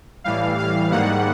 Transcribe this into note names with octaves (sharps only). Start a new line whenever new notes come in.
A2 E3 G3 F5
F5
G#2 D#3 G3 A#3 F#5